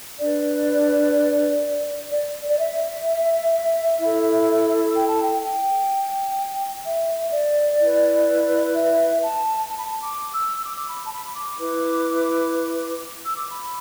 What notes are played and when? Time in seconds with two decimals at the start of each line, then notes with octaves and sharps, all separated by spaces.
0.21 D4 B4 D5
2.11 D5
2.48 D5
2.58 E5
4.00 E4 A4
4.95 G5
5.08 A5
5.23 G5
5.42 G5
6.85 E5
7.32 D5
7.80 E4 B4
8.75 E5
9.23 A5
9.70 A5
9.78 B5
9.85 A5
10.01 D6
10.33 E6
10.64 D6
10.77 D6
10.88 B5
11.06 A5
11.12 B5
11.27 B5
11.35 D6
11.59 E4 B4
13.25 E6
13.37 D6
13.50 B5